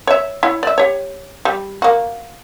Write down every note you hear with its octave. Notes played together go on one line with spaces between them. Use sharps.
C#5 E5
E4 C#5
D5 E5
G4 C#5
G3
A#3 F#4